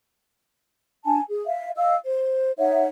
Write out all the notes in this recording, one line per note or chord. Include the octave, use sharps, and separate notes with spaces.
D4 G#5 A5
G#4
E5 F5
D#5 F5 E6
C5
D#4 C#5 E5 F#5